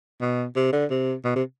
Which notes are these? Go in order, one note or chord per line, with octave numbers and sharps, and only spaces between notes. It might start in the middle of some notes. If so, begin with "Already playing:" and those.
B2
C3
D3
C3
B2
C3